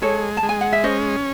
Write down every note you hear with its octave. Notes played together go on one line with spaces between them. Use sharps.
G#3 A4 C#5
A5
G#3
G#5
F#5
E5
C#4 C5 D#5